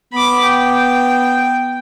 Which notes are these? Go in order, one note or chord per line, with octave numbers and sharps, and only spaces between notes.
B3 B5 D6
G5